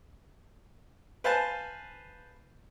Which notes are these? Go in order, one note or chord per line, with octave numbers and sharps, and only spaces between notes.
B4 C5 F5 G#5 A5